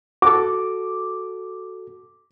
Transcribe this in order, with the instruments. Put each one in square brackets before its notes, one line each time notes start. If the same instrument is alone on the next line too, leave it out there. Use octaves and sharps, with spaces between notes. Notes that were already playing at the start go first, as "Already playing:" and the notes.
[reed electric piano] F#4 A4 [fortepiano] D6